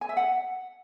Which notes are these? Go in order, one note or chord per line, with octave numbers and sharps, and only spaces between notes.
G#5
E5
F#5